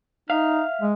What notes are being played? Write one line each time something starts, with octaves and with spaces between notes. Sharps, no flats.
D#4 E5 F5
G#3